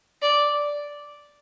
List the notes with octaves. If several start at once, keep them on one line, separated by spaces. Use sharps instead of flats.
D5